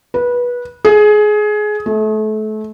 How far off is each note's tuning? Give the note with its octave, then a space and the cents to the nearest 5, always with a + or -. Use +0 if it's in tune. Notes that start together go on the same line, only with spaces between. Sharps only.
B4 -20
G#4 +20
A3 -30